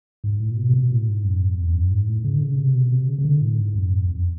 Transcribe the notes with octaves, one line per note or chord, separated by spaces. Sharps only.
G#2
A2
A#2
B2
C3
B2
A2
G#2
F#2
F2
E2
F#2
G#2
A2
C#3
D3
C#3
C3
B2
C3
C#3
C#3
D3
A2
G#2
F#2
F2
F2